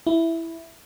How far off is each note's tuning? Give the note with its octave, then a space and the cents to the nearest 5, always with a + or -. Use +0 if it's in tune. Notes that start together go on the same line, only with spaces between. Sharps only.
E4 +0